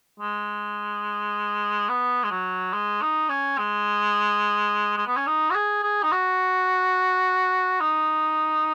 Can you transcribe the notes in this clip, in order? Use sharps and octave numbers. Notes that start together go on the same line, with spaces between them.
G#3
B3
G#3
F#3
G#3
D#4
C#4
G#3
G#3
B3
C#4
D#4
F#4
G#4
G#4
D#4
F#4
D#4